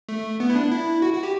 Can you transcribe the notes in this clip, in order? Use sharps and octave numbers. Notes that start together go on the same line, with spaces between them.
A3
B3
E4
D4
E4
F#4
F#4
G4